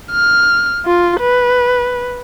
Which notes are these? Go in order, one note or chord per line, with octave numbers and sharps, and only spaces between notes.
F6
F4
B4